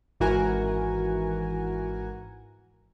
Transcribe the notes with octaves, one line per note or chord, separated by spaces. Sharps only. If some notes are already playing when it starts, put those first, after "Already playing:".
G#1 E3 F#4 A#4 G#5